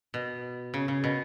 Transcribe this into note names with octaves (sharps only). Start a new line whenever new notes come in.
B2
C#3
C#3
B2